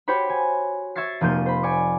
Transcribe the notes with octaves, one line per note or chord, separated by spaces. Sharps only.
F#4 G4 C5 C#5 B5
G#5
E5 C#6 G#6 A6 C7
F1 F3 A#3 G6 D#7
C5 B5
D5 G#5 C#6 D6